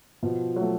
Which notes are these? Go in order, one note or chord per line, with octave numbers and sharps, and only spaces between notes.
B2 F3
F#3 A3